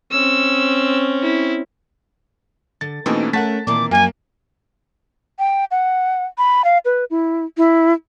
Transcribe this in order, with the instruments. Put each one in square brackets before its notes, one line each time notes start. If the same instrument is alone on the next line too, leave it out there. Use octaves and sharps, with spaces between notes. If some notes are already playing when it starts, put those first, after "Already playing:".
[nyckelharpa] C4 C#4 [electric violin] E6
[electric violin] E4
[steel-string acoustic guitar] D3 [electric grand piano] A6
[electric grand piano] B2 E3 A3 [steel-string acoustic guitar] A#3 C#4 G5 [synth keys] C4 D#4
[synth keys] A3 F#5 [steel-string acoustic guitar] C#4 A#4 [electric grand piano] A5 A6 B6
[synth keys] A#2 E3 [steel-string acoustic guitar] D#3 A#3 C4 [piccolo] D6
[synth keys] F#2 [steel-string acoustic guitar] F3 F#3 [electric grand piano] A#3 [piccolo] G#5
[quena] G5
F#5
B5
F5
B4
E4
E4